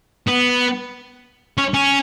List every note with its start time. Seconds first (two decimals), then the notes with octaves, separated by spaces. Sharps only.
0.28 B3
1.58 C#4
1.74 C#4